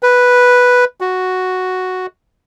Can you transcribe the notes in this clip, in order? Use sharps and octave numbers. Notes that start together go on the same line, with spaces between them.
B4
F#4